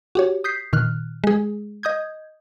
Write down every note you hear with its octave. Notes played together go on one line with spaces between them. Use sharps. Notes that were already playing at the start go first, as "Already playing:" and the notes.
F#4 G4 C#5
D#6 G6 B6 C7
A#2 D#3 F6 F#6
G#3 G#4
D#5 D#6 G6 G#6